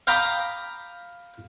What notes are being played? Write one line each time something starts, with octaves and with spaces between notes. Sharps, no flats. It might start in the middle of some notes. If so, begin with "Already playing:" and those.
F5 G5 A#5 B5 D6 D#6